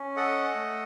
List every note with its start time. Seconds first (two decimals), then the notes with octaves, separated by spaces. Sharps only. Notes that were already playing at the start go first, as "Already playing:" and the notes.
Already playing: C#4
0.16 A4 D#5 F#5
0.55 A3